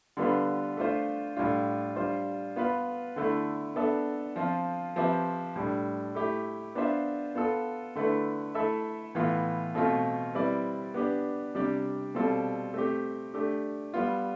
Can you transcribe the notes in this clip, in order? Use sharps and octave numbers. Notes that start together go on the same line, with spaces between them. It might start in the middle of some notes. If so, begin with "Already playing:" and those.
D3 G3 B3 F4 B4
A3 D4 F4 C5
A2 G3 D4 F4
G3 D4 F4 C5
B3 F4 B4
D3 A3 E4
B3 D4 A4 E5
F3 C4 F4
F3 C4 G4 B4 E5
A2 G3 D4
A3 E4 G4
B3 D4 F4 C5 E5
B3 F4 A4
D3 A3 E4 B4
A3 E4 A4 E5
A2 E3 B3 F4
B2 A3 C4 F4 A4
G3 C4 E4 B4 D5
B3 D4 G4 B4
C3 G3 D4 G4 D5
B2 G3 C4 F4 A4
A3 C4 G4
A3 D4 G4
G3 B3 F4